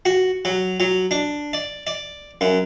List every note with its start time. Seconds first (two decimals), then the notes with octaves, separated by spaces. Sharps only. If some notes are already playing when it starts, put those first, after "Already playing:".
0.05 F#4
0.45 F#3
0.80 F#3
1.11 D4
1.53 D5
1.87 D5
2.41 F#2